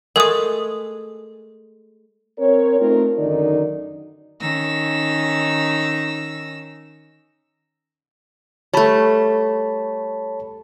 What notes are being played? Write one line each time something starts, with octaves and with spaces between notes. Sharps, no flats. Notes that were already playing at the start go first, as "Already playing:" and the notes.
G#3 A3 G#4 A#4 D#6
C4 A#4 C#5
A3 C4 D#4 F4 A#4
F#2 D3 D#3 D#4 D5
D#3 C#4 D#4 E6 A#6
G3 A3 C#5 A5 B5